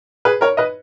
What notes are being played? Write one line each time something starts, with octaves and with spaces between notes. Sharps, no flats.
G#4 B4
A#4 C#5
B4 D#5